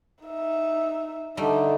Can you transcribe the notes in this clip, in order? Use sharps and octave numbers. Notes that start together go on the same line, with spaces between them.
D#4 E5
D3 G3 A3 D4 D#4